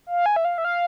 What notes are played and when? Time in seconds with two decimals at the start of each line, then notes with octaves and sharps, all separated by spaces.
0.07 F5
0.26 G#5
0.36 E5
0.45 F5
0.58 E5
0.65 F5